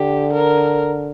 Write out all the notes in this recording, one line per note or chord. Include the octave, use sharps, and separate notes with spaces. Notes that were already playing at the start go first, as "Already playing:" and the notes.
Already playing: D3 G4
A#4